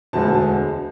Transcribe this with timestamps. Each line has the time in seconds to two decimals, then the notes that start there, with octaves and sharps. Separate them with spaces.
0.13 E1 D2 D3 G#3 A5